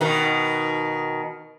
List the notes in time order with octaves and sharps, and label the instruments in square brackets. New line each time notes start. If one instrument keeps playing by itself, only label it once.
[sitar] B2 D#3